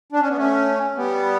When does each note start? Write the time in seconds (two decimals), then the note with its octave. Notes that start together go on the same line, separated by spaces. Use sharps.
0.12 D4
0.20 C#4
0.29 B3
0.36 A3 C#4
0.96 G3 B3